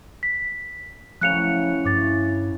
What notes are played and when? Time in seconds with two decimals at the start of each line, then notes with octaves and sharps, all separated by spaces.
0.23 B6
1.21 A2 C#3 F3 F#3 F#6 C#7 F7
1.85 G2 E4 C#5 D6 A6